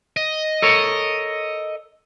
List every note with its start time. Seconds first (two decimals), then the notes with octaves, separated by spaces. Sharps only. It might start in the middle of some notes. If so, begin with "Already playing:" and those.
0.17 D#5
0.62 A4 A#4 C#5